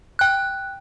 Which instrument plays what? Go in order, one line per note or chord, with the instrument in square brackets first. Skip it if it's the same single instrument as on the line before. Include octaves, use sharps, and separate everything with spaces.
[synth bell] G5 F#6